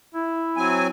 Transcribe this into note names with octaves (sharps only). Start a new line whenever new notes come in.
E4
F#3 C4 G#5